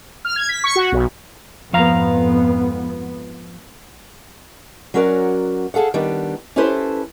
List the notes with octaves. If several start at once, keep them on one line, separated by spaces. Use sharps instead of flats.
F6
G#6
B6
C#6
F#4
B1
F2 G#2 F3 B3 F5 A#5
F#3 C#4 F#4 A#4 D5
G#4 A4 F5 F#5
D#3 G3 B3 D4
C#4 E4 G4 A4 B4 C5